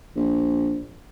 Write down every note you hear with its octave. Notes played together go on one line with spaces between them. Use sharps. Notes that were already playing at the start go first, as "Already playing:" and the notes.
A#1